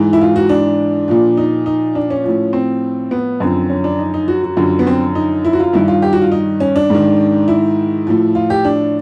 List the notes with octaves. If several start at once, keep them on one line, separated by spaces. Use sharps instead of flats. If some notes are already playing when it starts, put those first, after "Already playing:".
Already playing: G#2 E3
E4
F4
F#4
D4
A#2 F3
D#4
D#4
D4
C#4
A2 F3
C4
B3
F#2 D3 F3 C4
C#4
D4
D#4
D#4
F#4
F#4
F#2 D3 F3 F#4
B3
C4
D#4
E4
F#4
F4
G2 D#3 E4
F4
G4
F#4
F4
D#4
C#4
D4
G#2 D#3
E4
A2 F3
F4
G4
D4